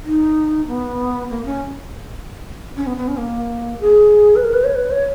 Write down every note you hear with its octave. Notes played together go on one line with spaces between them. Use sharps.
D#4
B3
A#3
C#4
C#4
B3
B3
C#4
A#3
G#4
B4
A#4
B4
C#5
B4
C#5